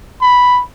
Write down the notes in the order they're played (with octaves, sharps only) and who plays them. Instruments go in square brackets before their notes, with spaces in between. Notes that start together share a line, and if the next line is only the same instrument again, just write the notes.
[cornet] B5